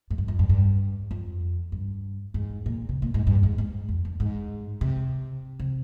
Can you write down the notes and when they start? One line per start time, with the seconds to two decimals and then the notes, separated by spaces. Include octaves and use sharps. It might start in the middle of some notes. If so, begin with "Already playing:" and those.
0.11 G#2
0.18 G2
0.28 F2
0.39 G2
0.49 G2
1.11 F2
1.72 G2
2.34 G#2
2.66 A#2
2.89 C3
3.02 A#2
3.14 G#2
3.27 G2
3.43 G#2
3.58 G#2
3.89 F2
4.05 G2
4.20 G#2
4.81 C3
5.59 C3